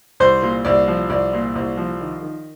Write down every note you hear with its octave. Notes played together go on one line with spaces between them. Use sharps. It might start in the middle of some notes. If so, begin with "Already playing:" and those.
C2 C5
A#2
C2 D5
F3
C2 D5
A#2
C2
F3
D#3
D#3